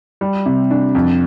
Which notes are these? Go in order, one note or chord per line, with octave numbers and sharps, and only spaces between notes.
G3
C3
D4
F2